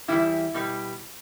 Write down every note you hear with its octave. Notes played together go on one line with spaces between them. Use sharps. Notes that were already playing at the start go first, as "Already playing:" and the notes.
E2 C3 G3 E4
B2 G3